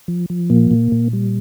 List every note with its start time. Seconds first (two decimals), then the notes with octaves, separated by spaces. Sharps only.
0.08 F3
0.30 F3
0.50 A#2 A#3
0.71 A#2
0.92 A#2
1.13 G3